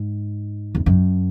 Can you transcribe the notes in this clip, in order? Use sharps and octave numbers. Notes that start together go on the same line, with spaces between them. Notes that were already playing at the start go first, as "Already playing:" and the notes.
Already playing: G#2
E2
F#2